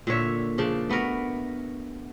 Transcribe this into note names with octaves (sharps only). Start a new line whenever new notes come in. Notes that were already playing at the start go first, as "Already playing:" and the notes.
A#2 D3 C#5 E5
C#3 F3 D4
A3 B3 F#4 A#4